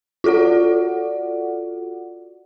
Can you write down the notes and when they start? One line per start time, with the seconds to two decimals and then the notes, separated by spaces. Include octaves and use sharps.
0.24 F4 F#4 A4 D5 F#5